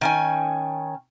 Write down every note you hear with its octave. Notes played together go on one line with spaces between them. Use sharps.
D#3 C#4 G#5